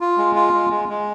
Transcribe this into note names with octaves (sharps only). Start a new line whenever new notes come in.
F4
G#3
F4
G#3
G#3
G#3